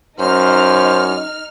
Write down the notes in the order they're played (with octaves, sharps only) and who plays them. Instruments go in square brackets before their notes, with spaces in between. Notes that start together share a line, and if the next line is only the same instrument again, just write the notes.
[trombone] F#2 [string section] D#4 F6 [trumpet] C5